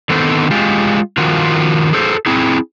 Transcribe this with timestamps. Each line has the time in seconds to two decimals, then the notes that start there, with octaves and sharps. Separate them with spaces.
0.10 D3 D#3 B3 C4 A4 C5
0.51 G#3 F4 G4
1.18 D#3 F3 F4 F#4
1.93 G#4 A4 C5
2.26 C4 E4 G#4